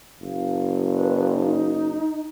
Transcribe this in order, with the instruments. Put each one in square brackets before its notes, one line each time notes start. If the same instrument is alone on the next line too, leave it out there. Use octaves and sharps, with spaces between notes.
[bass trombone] F#1 [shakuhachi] F5
[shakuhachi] B4
D#4